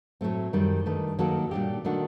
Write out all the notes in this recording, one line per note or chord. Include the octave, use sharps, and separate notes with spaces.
A2 F#3 A3 C4
F#2 D#3 G3
G2 D#3 A3
D#3 F#3 A#3 F#4 A4
A#2 G3 D4 G4
D#3 A3 D4 F#4